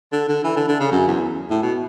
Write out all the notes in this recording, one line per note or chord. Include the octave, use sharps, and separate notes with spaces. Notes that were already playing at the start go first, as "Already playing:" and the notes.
D3
D3
E3
D3
D3
C#3
F#2
E2
A2
B2